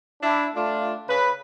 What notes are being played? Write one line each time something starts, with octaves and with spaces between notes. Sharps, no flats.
D4 E4
A3 D4 F4
C#3 B4